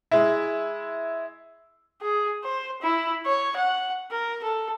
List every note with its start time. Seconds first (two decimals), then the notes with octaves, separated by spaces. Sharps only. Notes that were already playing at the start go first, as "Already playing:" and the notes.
0.11 G#3 E4
2.01 G#4
2.44 C5
2.82 E4
3.26 C#5
3.57 F#5
4.11 A#4
4.44 A4